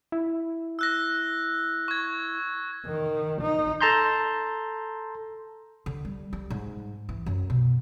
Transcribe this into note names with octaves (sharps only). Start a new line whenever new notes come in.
E4
E6 F#6 A#6
C#6 G#6
D#3
D#4
A4 A5 A#5 C6 G6
D3
G3
G3
G#2
E3
F#2
B2